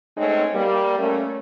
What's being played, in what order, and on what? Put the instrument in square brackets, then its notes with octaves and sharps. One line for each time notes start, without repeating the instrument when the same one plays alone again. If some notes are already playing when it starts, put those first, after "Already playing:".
[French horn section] G#2 G#3 A3 C4 C#4 D#4
G3 A#3
A3 A#3 C#4